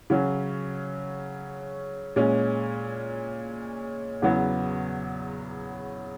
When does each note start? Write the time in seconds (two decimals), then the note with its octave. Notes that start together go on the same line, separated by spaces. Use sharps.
0.10 C#3 F#3 C#4
2.16 A#2 G#3 C#4
4.22 E2 C#3 F#3 B3